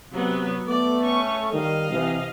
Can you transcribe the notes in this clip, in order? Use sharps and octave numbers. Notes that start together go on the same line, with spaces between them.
C3 F#3 B3
A3 B3 D5
C#4 C#6
D#3 G3 D#5 F5
C3 E3